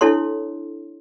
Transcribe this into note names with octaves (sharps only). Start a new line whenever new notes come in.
D4 E4 A4 C#5 C6